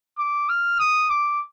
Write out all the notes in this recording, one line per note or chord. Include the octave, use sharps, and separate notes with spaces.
D6
F6
D#6
D6